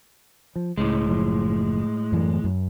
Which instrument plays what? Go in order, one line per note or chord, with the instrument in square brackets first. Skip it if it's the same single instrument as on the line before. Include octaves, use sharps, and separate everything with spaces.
[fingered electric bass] F3
[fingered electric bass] C#2 [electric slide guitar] A2 G#3
[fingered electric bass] F#1 F3
F#2 E3 A3
F#2